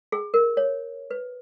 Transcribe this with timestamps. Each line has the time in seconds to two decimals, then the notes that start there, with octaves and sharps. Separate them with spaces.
0.12 G#4
0.34 A#4
0.57 C#5
1.11 B4